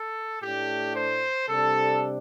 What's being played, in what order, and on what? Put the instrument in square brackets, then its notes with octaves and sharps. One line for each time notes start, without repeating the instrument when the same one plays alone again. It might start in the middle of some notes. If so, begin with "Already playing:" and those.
Already playing: [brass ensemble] A4
A2 A3 D4 G4
C5
C3 G3 D4 A4